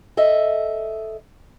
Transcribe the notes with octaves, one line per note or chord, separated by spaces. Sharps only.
A4 D#5 E5